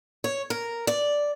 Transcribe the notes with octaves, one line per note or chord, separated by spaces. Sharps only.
C#5
A#4
D5